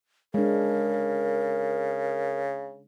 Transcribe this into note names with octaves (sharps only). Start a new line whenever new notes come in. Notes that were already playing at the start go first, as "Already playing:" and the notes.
C#3 G#3 D4 A#4